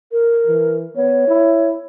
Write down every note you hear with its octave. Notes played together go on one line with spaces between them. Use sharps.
A#4
E3
B3 C#5
E4